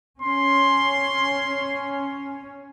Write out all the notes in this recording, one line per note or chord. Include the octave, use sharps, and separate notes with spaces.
C#4 C6